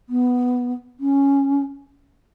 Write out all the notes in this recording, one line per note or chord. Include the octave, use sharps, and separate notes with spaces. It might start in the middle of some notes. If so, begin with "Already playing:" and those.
B3
C#4